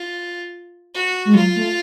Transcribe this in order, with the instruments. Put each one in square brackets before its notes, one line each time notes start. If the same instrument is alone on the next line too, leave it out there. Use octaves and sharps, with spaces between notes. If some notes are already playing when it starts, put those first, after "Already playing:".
Already playing: [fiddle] F4
F#4
[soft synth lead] G#3
[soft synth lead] F#3 [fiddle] F4
[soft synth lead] A3